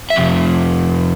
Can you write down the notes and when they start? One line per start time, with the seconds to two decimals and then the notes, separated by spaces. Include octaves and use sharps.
0.10 E5
0.16 F2 C3